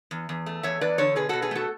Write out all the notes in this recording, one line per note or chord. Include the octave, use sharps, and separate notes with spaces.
E2
E2
A3
E2 C#5 E5
E2 B4 D5
D3 A4 C#5
B2 G#4 B4
B2 F#4 A4
G#4 B4
A3 F#4 A4